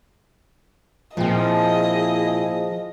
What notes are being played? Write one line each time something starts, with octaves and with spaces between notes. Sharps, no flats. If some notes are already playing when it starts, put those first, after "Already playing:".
A#2 F3 C4 E4 G#4 D#5